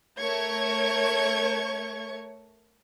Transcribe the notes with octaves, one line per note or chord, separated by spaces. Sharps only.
A3 A#4 C#5 C#6 G#6